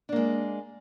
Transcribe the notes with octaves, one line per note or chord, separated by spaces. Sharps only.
G#3 A#3 D4